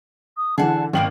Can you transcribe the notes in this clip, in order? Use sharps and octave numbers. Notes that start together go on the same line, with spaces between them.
D#6
D3 E3 G#4 F#5 A5
G#1 B2 D#3 A#3 G5 F#7